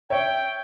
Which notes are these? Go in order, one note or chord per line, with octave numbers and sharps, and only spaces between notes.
C#5 E5 G5